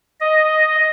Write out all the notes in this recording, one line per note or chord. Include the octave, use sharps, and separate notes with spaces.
D#5